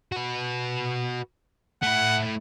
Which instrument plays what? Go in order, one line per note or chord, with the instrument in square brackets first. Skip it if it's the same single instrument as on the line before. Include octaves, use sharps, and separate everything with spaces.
[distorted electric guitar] F#4 B4
[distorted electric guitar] A3 E4 [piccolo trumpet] F#5